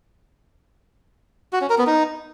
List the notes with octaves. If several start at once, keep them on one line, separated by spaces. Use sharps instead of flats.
F#4
C#4
A#4
B3
D#4